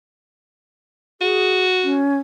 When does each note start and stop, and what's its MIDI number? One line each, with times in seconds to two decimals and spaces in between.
1.21 2.03 66
1.21 1.63 68
1.84 2.17 61